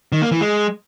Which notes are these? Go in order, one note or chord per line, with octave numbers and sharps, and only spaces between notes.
D#3
A#3
E3
G#3